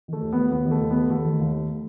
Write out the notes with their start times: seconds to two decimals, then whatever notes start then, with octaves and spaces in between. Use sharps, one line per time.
0.08 D#3 A3
0.22 D#2
0.33 A3 B3
0.51 D#2 B3
0.65 D#3
0.71 A3
0.81 D#2
0.91 B3
0.96 A3
1.10 D#2 A3
1.25 D#3
1.39 D#2
1.53 A3